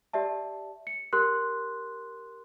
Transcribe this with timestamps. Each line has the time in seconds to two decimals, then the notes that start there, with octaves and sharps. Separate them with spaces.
0.13 G4 D5 E5 A5
0.87 C#7
1.13 G4 A#4 C6 F#6